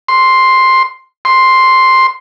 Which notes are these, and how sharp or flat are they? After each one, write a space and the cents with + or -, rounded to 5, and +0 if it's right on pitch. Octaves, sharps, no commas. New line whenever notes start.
C6 +5
C6 +5